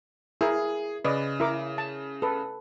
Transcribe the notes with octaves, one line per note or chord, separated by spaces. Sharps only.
E4 G#4 A#4
C#3 B4 D5 D#5
E4 A#4 D6
A5
A4 B4